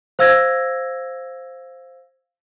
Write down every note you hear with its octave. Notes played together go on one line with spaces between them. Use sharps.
C5 F5 E6 G#6 A#6